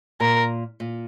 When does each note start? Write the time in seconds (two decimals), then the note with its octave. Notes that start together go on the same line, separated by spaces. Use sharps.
0.20 A#2 A#4
0.80 A#2